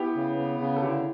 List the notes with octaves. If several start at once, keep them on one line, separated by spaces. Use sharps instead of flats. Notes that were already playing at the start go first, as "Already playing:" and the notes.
Already playing: B3 E4 G4
C#3
B3
C#3
A4
D3 E4 G4